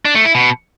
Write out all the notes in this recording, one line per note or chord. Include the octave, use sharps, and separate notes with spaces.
D4
A3
E4
B2